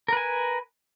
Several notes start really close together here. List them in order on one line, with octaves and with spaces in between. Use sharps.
A#4 B4 G#5